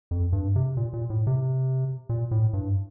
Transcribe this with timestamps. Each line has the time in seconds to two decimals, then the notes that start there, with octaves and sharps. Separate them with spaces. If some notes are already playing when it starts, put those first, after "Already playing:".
0.11 F2
0.33 G2
0.56 C3
0.77 A#2
0.93 A#2
1.10 A2
1.27 C3
2.09 A#2
2.31 A2
2.53 G2